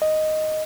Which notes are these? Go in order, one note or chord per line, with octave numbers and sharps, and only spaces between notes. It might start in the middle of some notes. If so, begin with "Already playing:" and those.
D#5